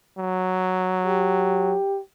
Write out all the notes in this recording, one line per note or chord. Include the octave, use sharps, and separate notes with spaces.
F#3
G4